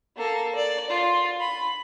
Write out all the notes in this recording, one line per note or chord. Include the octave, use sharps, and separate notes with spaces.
A#3 A4
D5
F4
B5